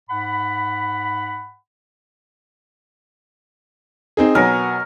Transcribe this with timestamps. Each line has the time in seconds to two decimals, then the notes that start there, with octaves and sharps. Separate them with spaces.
0.09 G#2 F#5 B5
4.17 C4 D#4 G#4
4.35 B2 F#3 B3 A#4 G#5